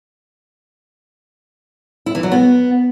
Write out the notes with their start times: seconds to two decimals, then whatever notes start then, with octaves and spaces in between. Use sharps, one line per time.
2.06 E4
2.15 E3
2.23 F#3
2.32 B3